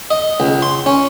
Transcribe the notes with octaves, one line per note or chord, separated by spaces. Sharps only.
D#5
C#2
C6
C#4